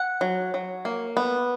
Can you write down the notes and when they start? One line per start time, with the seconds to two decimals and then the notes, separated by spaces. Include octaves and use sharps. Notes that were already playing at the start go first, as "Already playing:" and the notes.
Already playing: F#5
0.21 F#3
0.54 F#3
0.85 A#3
1.17 B3